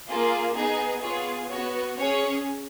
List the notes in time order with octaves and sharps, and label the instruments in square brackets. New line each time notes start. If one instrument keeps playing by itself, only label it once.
[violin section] A#3 F4 G#4
B3 D#4 G#4
B3 F4 G#4 C#5
B3 F#4 C#5
C#4 G#4 C#5